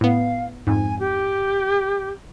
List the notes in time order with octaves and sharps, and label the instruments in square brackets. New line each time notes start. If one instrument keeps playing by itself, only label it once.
[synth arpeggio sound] A2 B3 [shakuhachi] F5
[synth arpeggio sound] F2 G#2 [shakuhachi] G#5
[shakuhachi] G4